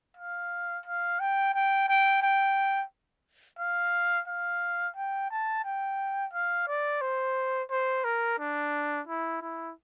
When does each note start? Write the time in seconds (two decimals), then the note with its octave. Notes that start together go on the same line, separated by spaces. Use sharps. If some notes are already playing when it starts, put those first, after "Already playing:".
0.17 F5
0.86 F5
1.20 G5
1.54 G5
1.88 G5
2.22 G5
3.59 F5
4.27 F5
4.96 G5
5.30 A5
5.64 G5
6.33 F5
6.68 D5
7.01 C5
7.70 C5
8.04 A#4
8.39 D4
9.07 E4
9.41 E4